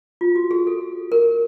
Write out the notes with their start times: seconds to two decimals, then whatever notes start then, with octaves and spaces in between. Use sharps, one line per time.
0.21 F4
0.36 F#4
0.51 G#4
0.67 A4
1.12 A#4